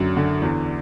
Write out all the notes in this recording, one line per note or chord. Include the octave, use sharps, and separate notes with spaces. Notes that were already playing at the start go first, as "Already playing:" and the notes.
Already playing: F#2 D3 F#3
D3
E2